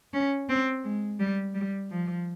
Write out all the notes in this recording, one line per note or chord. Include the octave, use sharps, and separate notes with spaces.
C#4
C4
G#3
G3
G3
F3